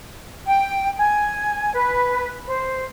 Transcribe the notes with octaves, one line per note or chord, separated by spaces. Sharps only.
G5
G#5
B4
C5